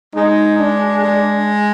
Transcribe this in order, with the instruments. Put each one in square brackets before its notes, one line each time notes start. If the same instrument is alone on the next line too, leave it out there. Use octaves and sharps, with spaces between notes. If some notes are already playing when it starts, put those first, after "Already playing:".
[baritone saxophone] G#3 [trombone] D#4
[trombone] D4
[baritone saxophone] G#3